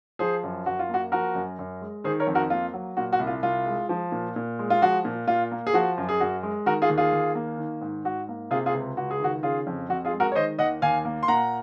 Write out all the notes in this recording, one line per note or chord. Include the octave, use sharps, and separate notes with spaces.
F3 G#4 C5
F#2
F#2 F#4
F4
A#3 F#4
F3 F#4 A#4
F#2
F#2
G#3
D#3 G#4 C5
A#4 C#5
F2
F#4 A#4
A#3 F4
F#3
A#2 F#4
F#4
C2
F4
C2 F4
G#3
F3
A#2
A#2
G#3
F4
F3 F#4
A#2
A#2 F4
A#3
G#4
F3 F#4
F#2
G#4
F#2 F#4
G#3
D#3 F#4 A#4
F4 G#4
D#2
F4 G#4
D#2
A#3
D#3
G#2
G#2 F#4
A#3
C3 F4 G#4
F4 G#4
C#2
C#2 F#4
G#4
D#3 F#4
C#3 F4 G#4
F2
F2 F#4
F4 G#4
G#3
F#4 A#4
C#5
D#3 C5 D#5
D#2 D#5 F#5
D#2 F5 G#5
A#3
C6
A#2 F#5 A#5